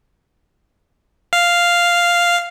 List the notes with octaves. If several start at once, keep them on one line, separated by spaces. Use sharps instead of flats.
F5